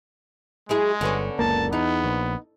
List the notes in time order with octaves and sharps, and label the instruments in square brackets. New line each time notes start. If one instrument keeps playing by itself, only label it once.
[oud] F#3 E4 G#4 [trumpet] G#3
[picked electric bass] G1 [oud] D3 B3 C#4
[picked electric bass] F#1 C#2 A#3 [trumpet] A5
[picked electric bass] E2 [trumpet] B3 [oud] D#4
[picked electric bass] A#1